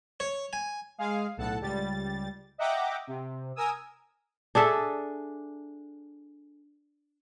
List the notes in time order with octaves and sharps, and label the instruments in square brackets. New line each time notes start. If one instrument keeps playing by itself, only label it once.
[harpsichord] C#5
G#5
[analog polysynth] G#3 G#4 F5
B1 A2 A4 F#5 A5
C#2 G3 A6
D#5 E5 F#5 G5 A#5 D6
C3
A#4 G#5 D#6 E6
[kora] D4 G#4 A4 E5